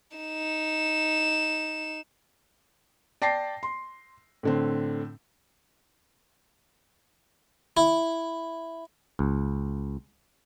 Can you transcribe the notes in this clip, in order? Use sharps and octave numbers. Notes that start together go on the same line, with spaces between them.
D#4 E7
D5 G5 A5 A#6 C7
C6
A2 D3 C4
E4
C#2